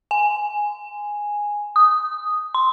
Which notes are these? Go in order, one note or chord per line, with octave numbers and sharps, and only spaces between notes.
G#5
D#6
C6